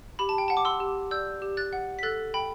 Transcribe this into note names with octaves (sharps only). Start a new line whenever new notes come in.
G4 B5
A5
G5
F#5 A5
D6
C6 E6
G4
D5 E6 G6
G4
F#6 A6
F#5
B6
A4 F#6 A6
G5 B5